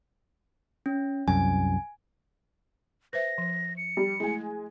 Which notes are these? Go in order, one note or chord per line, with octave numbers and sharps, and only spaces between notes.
C#4
C2 F#2 G#5
B4 C5 E5 A#6
F3
C#7
G3
G#3 A3 E4 G#5